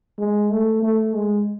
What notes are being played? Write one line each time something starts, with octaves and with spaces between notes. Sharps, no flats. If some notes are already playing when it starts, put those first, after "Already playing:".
G#3
A3
A3
G#3